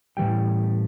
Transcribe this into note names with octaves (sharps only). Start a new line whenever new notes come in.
A2 E3 G3 G5